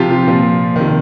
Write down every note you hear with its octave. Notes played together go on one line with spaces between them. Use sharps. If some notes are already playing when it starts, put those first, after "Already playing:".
Already playing: C3 F3 F4 G4
F4
A#2 F3
C3 D#3